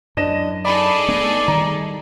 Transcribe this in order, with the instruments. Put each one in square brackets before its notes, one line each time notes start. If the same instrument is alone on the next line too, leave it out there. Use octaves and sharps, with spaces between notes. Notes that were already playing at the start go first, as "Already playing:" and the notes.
[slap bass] F#2 [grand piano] D4 A#6 E7 [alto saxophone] D#5
[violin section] D#4 G#4 A4 [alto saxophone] D5 [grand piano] B5
[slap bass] A3 B3 D4
[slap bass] D#3 G3 [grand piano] A#5